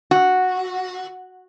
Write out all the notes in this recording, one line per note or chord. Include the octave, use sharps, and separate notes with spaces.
F#4